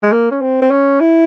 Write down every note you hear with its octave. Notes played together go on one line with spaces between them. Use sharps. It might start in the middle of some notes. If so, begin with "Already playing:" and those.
G#3
A#3
C#4
C4
C4
C#4
E4